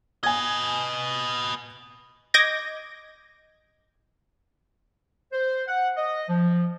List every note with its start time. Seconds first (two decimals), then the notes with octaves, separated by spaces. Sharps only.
0.23 B4 D#5 G#5 G#6
2.34 D#5 D6 G6 G#6 A#6
5.32 C5
5.68 F#5
5.97 D#5
6.29 F3